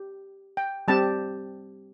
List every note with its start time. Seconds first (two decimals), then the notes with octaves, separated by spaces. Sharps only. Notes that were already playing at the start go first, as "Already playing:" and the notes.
Already playing: G4
0.57 G5
0.88 G3 C4 G4 A5